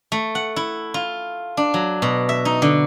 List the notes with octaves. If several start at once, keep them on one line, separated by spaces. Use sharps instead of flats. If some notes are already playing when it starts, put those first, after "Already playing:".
A3
F#5
E4
F4
D4
F#3
B2
E5
D#4
D3